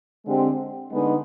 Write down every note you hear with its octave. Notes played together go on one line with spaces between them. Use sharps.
D3 G#3 C4 G4
D3 G#3 B3 D#4